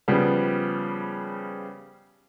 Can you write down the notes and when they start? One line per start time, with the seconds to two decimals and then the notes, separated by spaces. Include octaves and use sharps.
0.08 C#3 F3 G3 B3